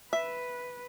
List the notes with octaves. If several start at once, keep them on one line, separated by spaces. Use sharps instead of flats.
B4 E5